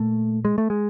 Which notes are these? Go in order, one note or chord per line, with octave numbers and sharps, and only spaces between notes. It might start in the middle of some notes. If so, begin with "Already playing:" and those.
Already playing: A#2 A3
G#3
A3
G#3